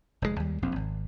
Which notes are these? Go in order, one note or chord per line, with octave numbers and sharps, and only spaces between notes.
F1 D#2 A#2 G#3
D#2 G3
E1 A#1 F2 C4
G#1